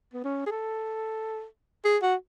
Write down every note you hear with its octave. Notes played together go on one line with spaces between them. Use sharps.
B3
C#4
G#4
A4
G#4
F#4